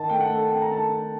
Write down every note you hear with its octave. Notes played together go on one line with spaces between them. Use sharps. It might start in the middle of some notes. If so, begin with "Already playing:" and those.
Already playing: D#3 A5
A3 G5
F#5
A3
C4 G5
A#5
D#3 A5
A3